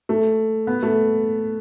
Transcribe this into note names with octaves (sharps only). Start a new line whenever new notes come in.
A3
B3
A3